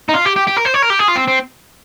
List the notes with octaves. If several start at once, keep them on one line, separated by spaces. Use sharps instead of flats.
D#4
F4
G4
G4
G4
A#4
C5
C#5
A#4
G4
G#4
F4
C4
C4